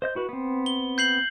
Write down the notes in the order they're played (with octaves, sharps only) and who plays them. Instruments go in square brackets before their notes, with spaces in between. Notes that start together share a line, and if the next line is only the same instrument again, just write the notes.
[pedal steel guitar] C5 D#5 G6
E4 F#4 B4
B3 C4
[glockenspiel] G7
G6 C7 F#7